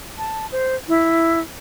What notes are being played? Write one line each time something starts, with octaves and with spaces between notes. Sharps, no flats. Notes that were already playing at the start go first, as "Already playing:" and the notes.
A5
C5
E4